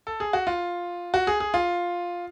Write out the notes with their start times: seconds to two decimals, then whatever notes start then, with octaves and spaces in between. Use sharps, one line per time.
0.07 A4
0.20 G#4
0.33 F#4
0.47 F4
1.14 F#4
1.27 G#4
1.40 G#4
1.54 F4